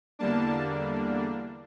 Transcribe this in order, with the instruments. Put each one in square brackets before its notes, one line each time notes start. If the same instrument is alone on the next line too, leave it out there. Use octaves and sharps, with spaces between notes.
[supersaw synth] E2 D3 G3 A#3 D4 A5